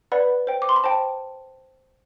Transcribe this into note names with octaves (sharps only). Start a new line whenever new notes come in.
B4 D5 F#5 B5
C5 G5
D6
C6
B5
C5 G5 A5